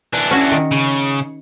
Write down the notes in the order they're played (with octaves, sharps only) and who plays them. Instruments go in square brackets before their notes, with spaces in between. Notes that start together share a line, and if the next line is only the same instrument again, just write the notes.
[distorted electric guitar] E3 D4
[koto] C#4 F#4
D#3
[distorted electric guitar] C#3